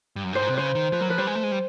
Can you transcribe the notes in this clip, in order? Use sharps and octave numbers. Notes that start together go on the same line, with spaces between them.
G2
F#2
G2 C5
G#2
C3 B4
C#3 C5
D#3
F3 B4
F#3 A#4
F3 B4
G3 C5
G#3
A3
G#3
G3